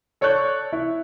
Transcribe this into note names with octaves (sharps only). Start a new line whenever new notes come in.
A4 C#5 D5 C#6 F#6 G6
E4